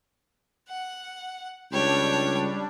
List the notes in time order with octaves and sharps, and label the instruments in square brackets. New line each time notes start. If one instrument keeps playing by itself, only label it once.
[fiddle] F#5
[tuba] C#2 [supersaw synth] G3 D4 [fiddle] C#5 G5